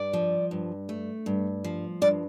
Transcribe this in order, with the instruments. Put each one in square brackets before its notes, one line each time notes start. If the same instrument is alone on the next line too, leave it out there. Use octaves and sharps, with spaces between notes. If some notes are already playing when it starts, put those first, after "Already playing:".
Already playing: [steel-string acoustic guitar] G2 D5
F3
G2
A3
G2
F3
G2 D5